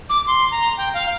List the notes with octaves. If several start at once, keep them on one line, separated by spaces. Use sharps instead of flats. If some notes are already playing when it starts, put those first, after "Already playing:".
D6
C6
A#5
G5
F5